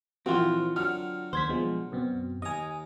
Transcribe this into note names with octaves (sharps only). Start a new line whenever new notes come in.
A#1 E3 A#3 C4 F4 F#4
D3 F#3 F6
D#2 C5 G#6 B6
B2 F3 G#3
F#2 B2 C4
D#2 D#5 G#5 A#5